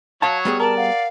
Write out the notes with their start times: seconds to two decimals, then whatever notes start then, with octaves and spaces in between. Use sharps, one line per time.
0.22 F#3 C#5 F5 A5
0.45 G3 B3 G#4
0.60 A#4 D5 A5 A#5
0.77 F5 F#5